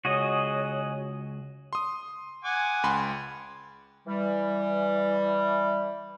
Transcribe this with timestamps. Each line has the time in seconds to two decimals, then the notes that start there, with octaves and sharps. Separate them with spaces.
0.05 C#2 F#4 G#4 C#5 D#5
1.73 C6 D#6
2.44 F#5 G#5 D6
2.83 C#2 B5 C6
4.07 E3 G3